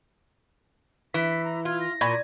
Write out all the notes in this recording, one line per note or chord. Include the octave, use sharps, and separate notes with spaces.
E3 B6
A#5
F4 G#6
A#6
A#2 B5 C#6 G#6